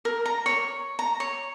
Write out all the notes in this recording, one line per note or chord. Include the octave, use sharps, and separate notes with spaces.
A#4
A#5
C#5
A#5
C#5